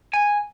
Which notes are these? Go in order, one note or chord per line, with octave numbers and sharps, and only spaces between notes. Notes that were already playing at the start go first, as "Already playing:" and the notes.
G#5